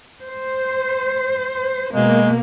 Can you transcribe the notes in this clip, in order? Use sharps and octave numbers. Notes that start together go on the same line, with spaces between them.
C5
B2 G#3 A#3